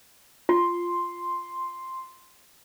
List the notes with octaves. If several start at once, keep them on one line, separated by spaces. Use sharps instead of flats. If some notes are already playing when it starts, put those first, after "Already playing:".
F4 C6